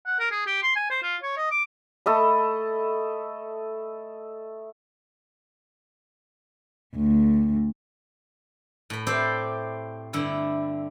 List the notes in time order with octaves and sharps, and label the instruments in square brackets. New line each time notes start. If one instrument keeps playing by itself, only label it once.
[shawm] F#5
A#4
G#4
G4
C6
G#5
C5
F4
C#5
D#5
D6
[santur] A3 A4 D#5 B5
[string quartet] D2
[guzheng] A2 B5
C4 E4 G4 A4 C5 D5
G2 D3 E4